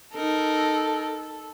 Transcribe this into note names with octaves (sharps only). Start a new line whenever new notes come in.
D#4 A4 A#4